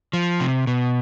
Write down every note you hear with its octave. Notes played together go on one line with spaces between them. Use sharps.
F3
C3
B2